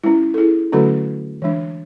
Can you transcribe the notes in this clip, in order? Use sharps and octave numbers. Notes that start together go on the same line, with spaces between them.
G#3 C#4 E4
A4
E4 G#4
D3 F#3 A3 C#4 F#4 A4
E3 G#3 D4